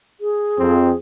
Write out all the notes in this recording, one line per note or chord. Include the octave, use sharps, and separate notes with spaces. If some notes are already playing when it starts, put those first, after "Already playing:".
G#4
F2 C4